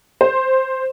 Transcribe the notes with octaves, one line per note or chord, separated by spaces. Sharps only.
C5